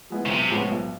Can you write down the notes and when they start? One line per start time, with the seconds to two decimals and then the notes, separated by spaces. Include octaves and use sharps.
0.10 F3 G#3 B3 E4
0.26 C#3
0.30 B1 C3
0.51 A2 F3 G#3 B3
0.70 B1